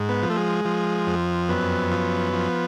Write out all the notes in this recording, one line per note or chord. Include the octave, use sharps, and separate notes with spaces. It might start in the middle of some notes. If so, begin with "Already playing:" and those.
Already playing: G#2
B3
F3
A3
G#3
F3
F2
F#2 B3
F3
F3